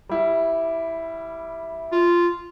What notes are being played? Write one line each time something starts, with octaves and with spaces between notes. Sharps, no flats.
G3 E4
F4